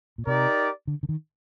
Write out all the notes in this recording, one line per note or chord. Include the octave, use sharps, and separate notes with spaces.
A#2
C3 D#4 G4 A#4 D5
D3
D3
D#3